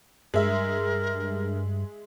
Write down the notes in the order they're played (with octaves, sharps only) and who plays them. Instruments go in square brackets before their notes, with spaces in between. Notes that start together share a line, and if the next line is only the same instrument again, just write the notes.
[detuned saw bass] G2 [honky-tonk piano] G#3 E5 [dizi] A#4